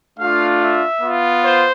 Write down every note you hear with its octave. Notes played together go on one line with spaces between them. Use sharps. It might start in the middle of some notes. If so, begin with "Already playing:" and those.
A3 D4 F4 F5
E5
B3 F4
C5